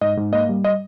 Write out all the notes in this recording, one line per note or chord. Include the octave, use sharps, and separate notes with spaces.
G#2 D#5
G#2
A#3 D#5
G3
D#5